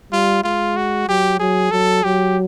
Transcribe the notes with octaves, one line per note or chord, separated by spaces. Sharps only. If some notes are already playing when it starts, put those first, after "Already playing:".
G3 F4
G#3 F4
F#4
F#3 G4
F#3 G#4
F#3 A4
F#3 G4